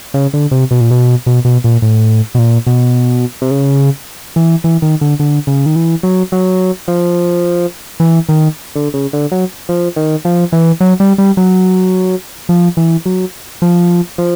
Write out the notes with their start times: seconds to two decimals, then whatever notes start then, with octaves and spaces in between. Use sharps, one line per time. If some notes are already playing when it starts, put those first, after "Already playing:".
0.14 C#3
0.33 D3
0.51 C3
0.71 B2
0.81 A#2
0.91 B2
1.26 B2
1.45 B2
1.64 A#2
1.82 A2
2.35 B2
2.39 A#2
2.67 B2
3.41 C3
3.51 C#3
4.36 E3
4.64 E3
4.82 D#3
5.01 D3
5.19 D3
5.47 C#3
5.66 D#3
5.76 E3
6.03 F#3
6.32 F#3
6.88 F3
8.00 E3
8.29 D#3
8.75 D3
8.94 C#3
9.13 D3
9.31 F#3
9.69 F3
9.96 D#3
10.25 F3
10.52 E3
10.80 F#3
11.00 G3
11.18 G3
11.37 F#3
12.49 F3
12.77 E3
13.06 F#3
13.62 F3
14.18 F3